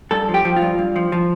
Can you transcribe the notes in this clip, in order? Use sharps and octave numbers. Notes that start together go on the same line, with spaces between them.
G2 A4
F3
G4
F3
F4
G2
G2
F3
F3